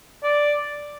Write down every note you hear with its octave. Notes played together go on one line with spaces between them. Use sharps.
D5